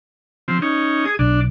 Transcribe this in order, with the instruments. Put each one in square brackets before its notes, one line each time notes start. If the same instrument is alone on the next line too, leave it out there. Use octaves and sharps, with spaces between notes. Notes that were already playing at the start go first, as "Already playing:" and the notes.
[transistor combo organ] F3 C4
C#4 D#4
G#4 D#6
[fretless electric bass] B1 [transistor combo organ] D4